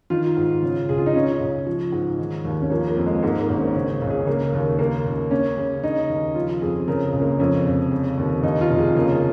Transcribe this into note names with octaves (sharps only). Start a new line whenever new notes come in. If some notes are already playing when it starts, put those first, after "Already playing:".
D#3 F4
G#2
C#3
C#2 G#4
F4
D#4
C#3 C#4
C#2
F3
G#2
D#3
D#2
C#4
F3 A#3
A#3
F2
G#3
G#2 A#3
A#3
G#1
C#4
C#3 C#4
C#2
G#4
C#3 A#3
D#2
C#3 A#3
C#2
A#3 C#4
C#3
C#3 D#4
D#2
F3 F4
F2 G#4
C#3 A#4
G#4
C#2
A#3
F2 C#4
F1
C#3
D#2
D#2 D#4
F4
F1
G#4
C#3 A#3